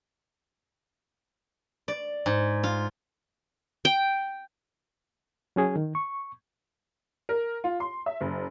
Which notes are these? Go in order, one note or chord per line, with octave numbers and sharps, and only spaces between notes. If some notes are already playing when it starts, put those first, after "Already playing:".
D5
G#2
F4
G5
F#3 C#4 G#4
D#3
C#6
A#4
F4
C6
E5
F#1